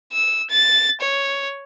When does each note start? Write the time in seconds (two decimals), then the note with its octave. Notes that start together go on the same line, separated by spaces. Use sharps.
0.13 E6
0.50 A6
1.01 C#5